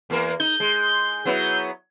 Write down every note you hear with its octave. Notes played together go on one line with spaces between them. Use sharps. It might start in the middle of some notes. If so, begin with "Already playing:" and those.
E2 A#3 A#4
D#4 G6
G#3
F#3 B3 E4